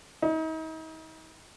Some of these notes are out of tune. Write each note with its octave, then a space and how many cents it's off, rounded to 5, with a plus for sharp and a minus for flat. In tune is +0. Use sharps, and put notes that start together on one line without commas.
D#4 +40